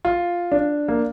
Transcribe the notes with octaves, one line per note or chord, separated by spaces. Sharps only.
F4
D4
A#3